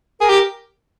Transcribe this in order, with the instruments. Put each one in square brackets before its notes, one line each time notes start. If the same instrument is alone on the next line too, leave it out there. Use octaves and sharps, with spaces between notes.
[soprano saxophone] G#4 [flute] A#4
[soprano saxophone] G4